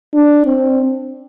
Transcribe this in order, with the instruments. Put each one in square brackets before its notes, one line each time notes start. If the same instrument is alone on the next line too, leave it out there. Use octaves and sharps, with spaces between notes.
[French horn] D4
C4